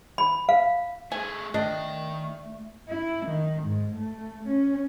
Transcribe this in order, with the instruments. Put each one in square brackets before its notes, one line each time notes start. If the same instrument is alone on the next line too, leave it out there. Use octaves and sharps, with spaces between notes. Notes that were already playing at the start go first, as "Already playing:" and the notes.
[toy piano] B5
F5
[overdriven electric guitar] A3 G#4 [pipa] G#5
[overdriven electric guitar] D#3 G5 [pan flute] A3 [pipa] D4 [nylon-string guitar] D#5
[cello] E4
D#3
G#2
A3
C#4